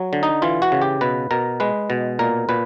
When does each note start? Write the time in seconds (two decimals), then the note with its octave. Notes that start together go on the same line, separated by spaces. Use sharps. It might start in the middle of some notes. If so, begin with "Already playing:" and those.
Already playing: F#3
0.13 D3
0.23 D#4
0.42 E3 F4
0.62 F#4
0.72 C#3
0.82 G4
1.01 B2 B4
1.31 B2 A#4
1.60 G#3 B4
1.90 B2
2.19 A#2 A#4
2.49 A#2 B4